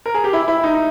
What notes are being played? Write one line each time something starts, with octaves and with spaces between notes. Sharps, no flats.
A#4
G#4
G4
E4
E4
D#4